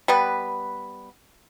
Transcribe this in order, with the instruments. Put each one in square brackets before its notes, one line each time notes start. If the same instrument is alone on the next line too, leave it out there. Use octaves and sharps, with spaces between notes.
[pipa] G3 B3 B4